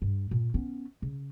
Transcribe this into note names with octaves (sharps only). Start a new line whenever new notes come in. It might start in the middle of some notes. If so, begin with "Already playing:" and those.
G2
A#2
B3 C#4
C#3